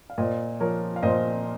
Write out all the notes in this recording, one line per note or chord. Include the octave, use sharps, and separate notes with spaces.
F5
A#2 C5 D#5
F3 A#4 C#5
F5
A#2 C5 D#5